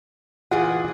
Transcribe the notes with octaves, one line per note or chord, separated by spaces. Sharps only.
A#2 E3 F4 G#4 F#5